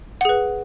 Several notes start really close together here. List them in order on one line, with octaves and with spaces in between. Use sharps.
F#5 G#4 B4